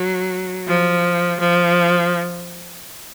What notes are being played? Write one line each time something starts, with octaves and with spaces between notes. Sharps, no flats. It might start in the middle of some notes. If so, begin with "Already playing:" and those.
Already playing: F#3
F3
F3